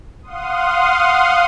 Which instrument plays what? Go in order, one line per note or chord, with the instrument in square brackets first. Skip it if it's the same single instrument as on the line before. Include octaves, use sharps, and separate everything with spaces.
[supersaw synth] F5 F#5 C6 D#6